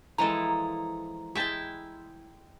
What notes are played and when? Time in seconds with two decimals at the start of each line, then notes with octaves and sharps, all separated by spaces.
0.18 E3 F3 G#3 E4 A4 A#5
1.35 G#3 E4 E5 G5 A5